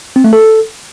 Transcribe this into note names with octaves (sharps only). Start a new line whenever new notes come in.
C4
A3
A4